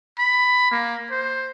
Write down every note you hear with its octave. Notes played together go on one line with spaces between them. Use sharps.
B5
A#3
C5